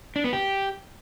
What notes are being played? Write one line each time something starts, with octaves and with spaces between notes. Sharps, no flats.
D4
B3
G4